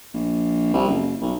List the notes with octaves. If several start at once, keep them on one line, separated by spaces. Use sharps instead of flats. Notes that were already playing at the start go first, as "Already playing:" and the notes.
A#1
C2
F#1
B1